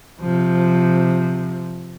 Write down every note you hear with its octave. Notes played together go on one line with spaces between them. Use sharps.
C3 F3